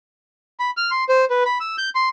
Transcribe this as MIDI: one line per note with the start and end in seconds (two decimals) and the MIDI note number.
0.59 0.71 83
0.77 0.91 89
0.91 1.04 84
1.09 1.25 72
1.30 1.44 71
1.45 1.58 83
1.60 1.76 88
1.78 1.90 91
1.95 2.09 84